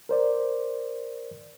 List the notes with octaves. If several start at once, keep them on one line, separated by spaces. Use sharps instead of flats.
A#4 C5 D5